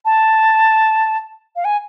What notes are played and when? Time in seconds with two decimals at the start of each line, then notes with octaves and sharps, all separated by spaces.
0.05 A5
1.56 F5
1.65 G#5